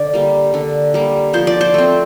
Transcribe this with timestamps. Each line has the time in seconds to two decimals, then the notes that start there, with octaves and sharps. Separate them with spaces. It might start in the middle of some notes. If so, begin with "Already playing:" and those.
Already playing: D3 D5
0.13 G3 A#3
0.54 D3
0.94 G3 A#3
1.33 F3 C5
1.47 D5
1.61 C5
1.74 A3 C4